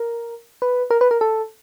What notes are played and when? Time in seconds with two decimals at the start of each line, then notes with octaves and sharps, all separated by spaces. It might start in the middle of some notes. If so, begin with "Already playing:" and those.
Already playing: A#4
0.62 B4
0.90 A#4
1.01 B4
1.11 A#4
1.21 A4